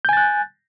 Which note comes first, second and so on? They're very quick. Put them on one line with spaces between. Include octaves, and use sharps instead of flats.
G6 G#5 A6 F#6